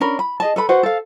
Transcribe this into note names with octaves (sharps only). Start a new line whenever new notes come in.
C#4 D4 A#4 B5
B5
G#4 D#5 A5
A4 B4 B5
F#4 B4 C5 F#5
A4 F5